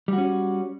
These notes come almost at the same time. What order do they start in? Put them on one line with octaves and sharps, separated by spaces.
G3 F#4 C#4